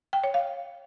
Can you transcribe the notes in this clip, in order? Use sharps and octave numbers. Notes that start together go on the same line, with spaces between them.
G5
C#5
F5